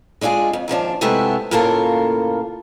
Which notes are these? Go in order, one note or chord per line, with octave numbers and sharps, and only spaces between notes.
G#3 D4 E4 F4 G#4
F2
D#2 G#2 F3 D4
C3 G#3 A3 B3 E4 G4
A2 C#3 A#3 F4 A4 A#4